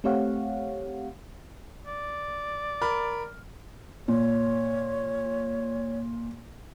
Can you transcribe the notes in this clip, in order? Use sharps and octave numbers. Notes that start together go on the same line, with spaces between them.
A3 C4 G4 C#5 F5 F#5
D5
A#4 B5
A#2 C#5